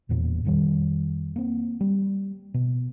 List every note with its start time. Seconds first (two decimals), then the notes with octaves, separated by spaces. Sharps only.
0.09 E1 E2 A#2
0.45 F2 D#3 G3
1.36 A#3 C4
1.81 G3
2.54 B2